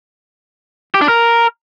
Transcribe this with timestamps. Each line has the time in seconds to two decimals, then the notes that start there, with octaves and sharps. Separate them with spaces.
0.95 G4
1.01 D4
1.08 A#4